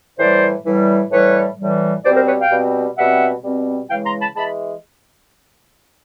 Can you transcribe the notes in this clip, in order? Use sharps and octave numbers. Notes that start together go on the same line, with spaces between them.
A2 E3 G3 C5 D5
A2 E3 G3
A2 E3 G3 B4 C#5
A2 E3 G3
B2 G3 C4 C5 D5
A#4 C5
B4 C#5
F5 G5
B2 G3 C4
B2 G3 C4 E5 F#5
B2 G3 C4
C#3 E3 G#3 F5 G5
A#5 C6
A5 B5
E3 G#3 A5 B5